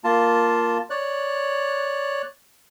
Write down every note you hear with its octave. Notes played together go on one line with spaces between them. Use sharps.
A#3 F4 A5
C#5 D5 F#6